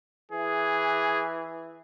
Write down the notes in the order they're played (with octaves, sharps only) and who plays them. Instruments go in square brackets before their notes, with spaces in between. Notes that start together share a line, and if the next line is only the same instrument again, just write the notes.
[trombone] E3 [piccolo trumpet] G#4